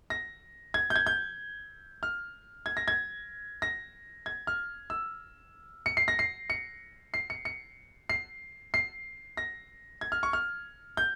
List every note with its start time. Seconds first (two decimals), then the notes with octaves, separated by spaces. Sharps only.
0.10 A#6
0.74 G#6
0.90 G6
0.96 G#6
1.07 G6
2.03 F6
2.66 G#6
2.77 A#6
2.88 G#6
3.62 A#6
4.26 G#6
4.47 F6
4.90 E6
5.86 C#7
5.97 C7
6.08 A#6
6.19 C7
6.50 C#7
7.14 C7
7.30 C#7
7.45 C#7
8.09 C7
8.74 C7
9.37 A#6
10.01 G#6
10.12 F6
10.23 C#6
10.33 F6
10.97 G6